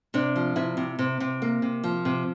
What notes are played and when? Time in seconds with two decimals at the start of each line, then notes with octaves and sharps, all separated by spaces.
0.14 C3 D4
0.36 F3
0.56 C3 E4
0.77 C3
0.99 C3
1.20 C3
1.42 A#3
1.62 C3
1.84 F3
2.05 C3